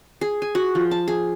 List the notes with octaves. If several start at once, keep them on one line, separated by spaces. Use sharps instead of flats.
G#4
G#5
F#4
F3
A5
G#4